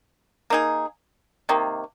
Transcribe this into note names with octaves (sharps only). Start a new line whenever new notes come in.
A#3 D#4 G#4
C3 D#3 A#3